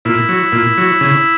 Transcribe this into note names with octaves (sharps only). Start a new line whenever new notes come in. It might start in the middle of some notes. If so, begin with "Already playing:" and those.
A#2 E4
F#3
A#2
F#3
C#3